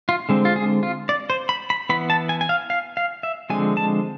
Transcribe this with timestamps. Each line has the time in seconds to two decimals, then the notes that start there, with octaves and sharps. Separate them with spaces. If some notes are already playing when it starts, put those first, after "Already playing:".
0.09 F4
0.29 D3 G#3 C4
0.45 F4
0.56 G#4
0.83 F4
1.09 D5
1.30 C5
1.49 B5
1.70 B5
1.89 E3 B3 B5
2.10 A5
2.29 G#5
2.41 G#5
2.49 F5
2.70 F5
2.97 F5
3.23 E5
3.50 D3 F3 G#3 C4 G#5
3.77 A5